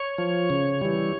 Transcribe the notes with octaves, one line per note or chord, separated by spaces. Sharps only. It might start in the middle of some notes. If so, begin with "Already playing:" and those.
Already playing: C#5
F3
C#3
E3 G3